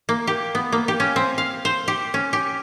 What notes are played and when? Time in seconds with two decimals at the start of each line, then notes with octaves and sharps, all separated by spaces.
0.09 A#3
0.27 G4
0.55 B3
0.72 A#3
0.88 G4
1.00 C#4
1.16 C4
1.38 F5
1.65 C5
1.88 G4
2.14 C#4
2.33 G4